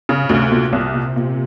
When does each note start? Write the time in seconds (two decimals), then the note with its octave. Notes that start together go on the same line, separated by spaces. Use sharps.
0.09 C#3
0.23 C3
0.29 D2
0.51 A#2
0.73 C2
0.94 A#2
1.16 A#2